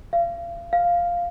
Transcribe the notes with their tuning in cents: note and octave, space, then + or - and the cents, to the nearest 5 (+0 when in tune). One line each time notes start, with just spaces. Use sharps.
F5 -35
F5 +0